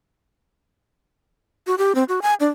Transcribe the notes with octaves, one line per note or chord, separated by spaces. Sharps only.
F#4
G4
C4
F#4
G#5
D4